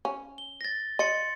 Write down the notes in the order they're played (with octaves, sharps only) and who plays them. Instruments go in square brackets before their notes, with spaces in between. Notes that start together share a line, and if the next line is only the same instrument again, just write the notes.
[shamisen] C#4
[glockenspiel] G7
A6 A#6
[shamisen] D#5 [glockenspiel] C6 A6 C#7